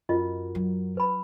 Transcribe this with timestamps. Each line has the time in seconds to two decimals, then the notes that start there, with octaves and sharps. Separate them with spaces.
0.09 F#2 F4 F#4 A#4 D#5
0.55 F#3
0.97 B4 B5